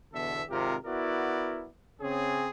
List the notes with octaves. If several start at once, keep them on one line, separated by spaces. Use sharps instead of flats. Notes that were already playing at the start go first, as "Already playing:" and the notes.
E2 B2 D3 A4 E5
G#1 C3 F4 G4 A#4
B3 E4 F#4 A#4 D5
C#3 C4 C#4 G#4